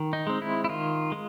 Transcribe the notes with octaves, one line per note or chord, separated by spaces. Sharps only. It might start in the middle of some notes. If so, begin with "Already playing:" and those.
Already playing: D#3
D#4
G#3 C4
E4
E4
D#3 F4
G#3